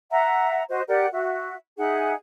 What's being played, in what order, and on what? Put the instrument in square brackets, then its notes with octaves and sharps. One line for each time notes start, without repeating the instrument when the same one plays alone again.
[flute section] E5 F#5 A#5
F#4 C5 D#5
G4 A#4 D5 F#5
F#4 E5
D#4 G#4 E5 F#5